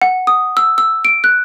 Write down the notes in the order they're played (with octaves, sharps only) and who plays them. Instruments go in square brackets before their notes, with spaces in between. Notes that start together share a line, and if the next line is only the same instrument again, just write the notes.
[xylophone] F#5
D#6
E6
E6
D7
F#6